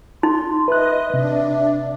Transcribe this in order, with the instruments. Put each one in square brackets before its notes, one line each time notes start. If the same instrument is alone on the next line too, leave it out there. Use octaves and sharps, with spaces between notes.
[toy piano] D#4 [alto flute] C6
[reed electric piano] B4 F#6 [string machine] D#5 [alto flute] E5
[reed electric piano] C3 [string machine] D4